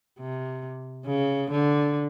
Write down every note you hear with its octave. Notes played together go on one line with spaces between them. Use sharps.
C3
C#3
D3